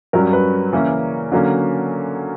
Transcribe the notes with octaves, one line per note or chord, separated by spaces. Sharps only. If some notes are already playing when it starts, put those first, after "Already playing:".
G2 F#3 C#4 A#4
B4
C#3 E3 A#3 C#4
D3 F#3 A#3 C#4